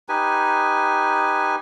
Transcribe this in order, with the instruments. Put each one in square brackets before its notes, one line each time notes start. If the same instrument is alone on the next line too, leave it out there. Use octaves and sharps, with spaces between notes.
[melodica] D#4 G4 B4 G#5